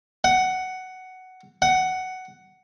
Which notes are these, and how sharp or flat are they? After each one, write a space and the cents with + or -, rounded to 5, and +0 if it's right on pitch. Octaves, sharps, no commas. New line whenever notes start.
F#5 +10
F#5 +10